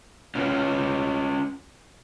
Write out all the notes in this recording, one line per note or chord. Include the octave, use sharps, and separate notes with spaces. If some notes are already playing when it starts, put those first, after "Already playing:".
C#4 F4 B4